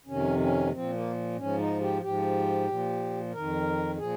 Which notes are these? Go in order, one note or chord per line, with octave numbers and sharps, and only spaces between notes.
F2 C3 D#3 C#4
C#4
A#3
A#2 F3 C4
A#3
G#2 F3 C#4
D#4
G4
G#2 F3 G4
A#2 F3
F2 D#3 A#4
A#2 F3 G#4